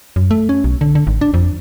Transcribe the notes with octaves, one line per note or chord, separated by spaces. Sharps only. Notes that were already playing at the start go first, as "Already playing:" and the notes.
F#2
A3
C#4
B1
D3
D3
G#1
D4
F2